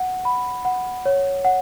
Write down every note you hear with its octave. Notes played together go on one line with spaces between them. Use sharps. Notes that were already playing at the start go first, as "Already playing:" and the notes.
Already playing: F#5
B5
F#5
C#5
F#5